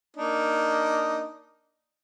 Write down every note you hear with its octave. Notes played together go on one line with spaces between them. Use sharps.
A#3 D4 D#4